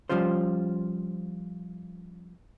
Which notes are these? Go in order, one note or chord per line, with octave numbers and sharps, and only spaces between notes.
F3 G3 C#4 F4 C5